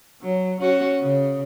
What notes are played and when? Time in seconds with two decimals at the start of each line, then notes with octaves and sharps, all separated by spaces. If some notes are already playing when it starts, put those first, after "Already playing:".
0.22 F#3
0.61 C#4 F#4
1.01 C#3